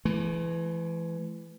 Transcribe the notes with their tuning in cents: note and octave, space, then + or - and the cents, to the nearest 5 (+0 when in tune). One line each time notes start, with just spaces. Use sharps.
E3 +20 A3 -40